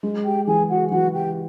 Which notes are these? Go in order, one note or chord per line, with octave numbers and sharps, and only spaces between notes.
G#3
G4 G5
E3 G#4 G#5
F#4 F#5
E3 F#4 F#5
G4 G5